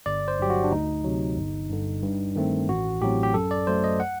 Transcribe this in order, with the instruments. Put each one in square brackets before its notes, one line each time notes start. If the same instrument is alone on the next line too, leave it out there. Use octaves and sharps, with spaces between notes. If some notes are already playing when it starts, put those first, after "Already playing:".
[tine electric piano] G1 D5
C5
G2 F#3 G4
F#4
D4
D2 D#4
C3 F#3
G1
G2 D3
G2
D#3 A3 C4
A1 F#4
A2 F#3 C4 G4
G4
F#2 A4
D5
F#3 A3 C5
D#5
F#5